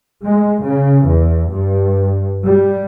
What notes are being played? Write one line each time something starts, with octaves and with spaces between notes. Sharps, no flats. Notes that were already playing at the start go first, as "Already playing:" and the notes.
G#3
C#3
E2
G2
G3